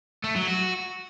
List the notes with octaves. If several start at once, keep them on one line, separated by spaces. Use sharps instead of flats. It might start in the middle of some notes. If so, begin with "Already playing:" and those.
A3
F#3
F#4